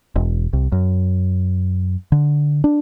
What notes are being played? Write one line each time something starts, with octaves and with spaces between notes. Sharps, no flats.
E1
C2
F#2
D3
D4